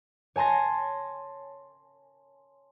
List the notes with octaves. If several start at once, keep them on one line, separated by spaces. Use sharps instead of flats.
C#5 G#5 A5 C6 A#6